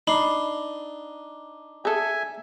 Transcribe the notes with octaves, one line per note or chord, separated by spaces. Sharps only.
D4 D#4 B5 C7
G#4 A4 E5 G#5